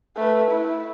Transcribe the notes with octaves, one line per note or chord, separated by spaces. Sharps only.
A3 B4
E4